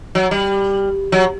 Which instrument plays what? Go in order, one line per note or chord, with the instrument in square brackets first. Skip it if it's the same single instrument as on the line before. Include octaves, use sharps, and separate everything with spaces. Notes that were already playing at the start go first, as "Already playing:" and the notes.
[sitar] F#3
G3
F#3